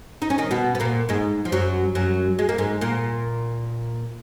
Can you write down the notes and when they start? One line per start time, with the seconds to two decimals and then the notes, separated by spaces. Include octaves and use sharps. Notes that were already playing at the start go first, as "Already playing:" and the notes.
0.22 D#4
0.30 C#4
0.38 D#3 D#4
0.51 B2 B3
0.75 B3
0.80 A#2 A#3
1.09 G#2 G#3
1.45 F3
1.52 F#2 F#3
1.95 F#2 F#3
2.39 G#3
2.49 A#3
2.58 G#2 G#3
2.81 A#2 A#3